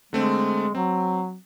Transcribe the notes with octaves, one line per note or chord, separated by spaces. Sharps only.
D3 G#3 A3 C4
F#3 C4